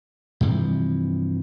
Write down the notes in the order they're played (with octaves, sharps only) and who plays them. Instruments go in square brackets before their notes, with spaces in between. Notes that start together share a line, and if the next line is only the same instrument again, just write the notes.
[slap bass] G2 C3 E3 F3